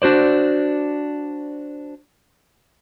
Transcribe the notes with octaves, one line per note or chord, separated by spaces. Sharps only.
D4 F#4 C5 D5